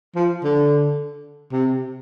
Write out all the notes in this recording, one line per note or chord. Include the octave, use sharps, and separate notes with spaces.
F3
D3
C3